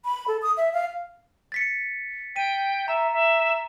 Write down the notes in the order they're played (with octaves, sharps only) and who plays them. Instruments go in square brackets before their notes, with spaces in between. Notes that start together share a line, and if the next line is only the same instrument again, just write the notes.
[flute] B5
A4
D#6
E5
F5
[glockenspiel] A6 B6 C#7
[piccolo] G5 [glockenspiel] B6 D#7
[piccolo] E5 [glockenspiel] A#5
[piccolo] E5